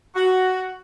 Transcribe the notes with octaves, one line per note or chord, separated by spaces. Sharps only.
F#4